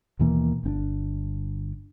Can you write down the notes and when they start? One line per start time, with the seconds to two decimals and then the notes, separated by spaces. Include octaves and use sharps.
0.19 D#2 B2 E3 A#3
0.64 G1 C4 D4